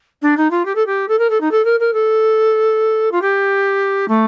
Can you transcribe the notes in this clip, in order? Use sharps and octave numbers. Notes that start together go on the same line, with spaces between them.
D4
D#4
F4
G4
A4
G4
A4
A#4
A4
D#4
A4
A#4
A#4
A4
F4
G4
A3